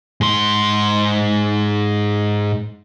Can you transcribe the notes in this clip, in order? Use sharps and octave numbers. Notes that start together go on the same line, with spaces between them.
G#2 C6